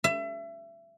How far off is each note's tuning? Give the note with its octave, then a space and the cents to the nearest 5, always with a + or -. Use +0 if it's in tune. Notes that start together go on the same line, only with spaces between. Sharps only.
E5 +30